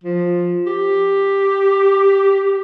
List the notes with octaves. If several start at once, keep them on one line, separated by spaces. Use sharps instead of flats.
F3
G4